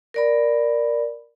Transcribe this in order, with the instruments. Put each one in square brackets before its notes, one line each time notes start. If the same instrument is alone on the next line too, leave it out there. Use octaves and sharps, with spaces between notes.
[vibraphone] A#4 D5 B5